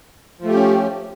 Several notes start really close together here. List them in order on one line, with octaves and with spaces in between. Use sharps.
F3 A3 G4 C#4